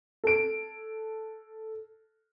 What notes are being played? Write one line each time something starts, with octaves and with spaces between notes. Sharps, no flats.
A4 D7